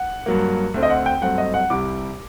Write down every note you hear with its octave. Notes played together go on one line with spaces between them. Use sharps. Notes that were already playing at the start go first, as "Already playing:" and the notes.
Already playing: F#5
G2 F#3 A#3
D2 D3 A3 C4
D#5
F#5
G5
G2 F#3 A3 C4 F#5
D#5
F#5
C2 C3 G3 D6